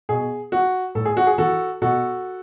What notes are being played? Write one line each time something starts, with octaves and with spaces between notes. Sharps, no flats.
B2 G#4
F#4
A2 A4
G#4
F#4
G#4
E3 F#4 A4
B2 F#4 A4